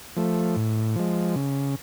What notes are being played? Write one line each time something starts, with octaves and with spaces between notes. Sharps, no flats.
F3 A3
A2
F3 G#3
C#3